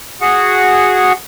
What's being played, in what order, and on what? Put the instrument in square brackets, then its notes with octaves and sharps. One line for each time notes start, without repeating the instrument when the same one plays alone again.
[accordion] F#4 G#4 F#5